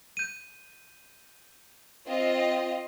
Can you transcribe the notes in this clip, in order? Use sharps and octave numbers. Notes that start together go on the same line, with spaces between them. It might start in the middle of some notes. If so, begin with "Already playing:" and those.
G6 D#7
C4 F4 D#5